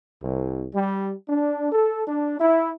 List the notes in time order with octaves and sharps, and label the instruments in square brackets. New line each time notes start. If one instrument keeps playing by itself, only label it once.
[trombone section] C2
G3
D4
A4
D4
E4